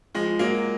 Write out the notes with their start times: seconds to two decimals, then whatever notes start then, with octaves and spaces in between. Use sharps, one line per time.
0.15 F3 G#3
0.39 F#3 A#3